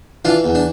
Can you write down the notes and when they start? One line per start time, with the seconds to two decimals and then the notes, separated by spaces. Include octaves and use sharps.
0.25 E3 D4 F4
0.44 E2
0.55 D4